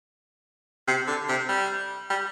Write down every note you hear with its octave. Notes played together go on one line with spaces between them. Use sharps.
C3
D3
C3
G3
G3